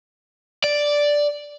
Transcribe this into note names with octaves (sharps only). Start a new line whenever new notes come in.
D5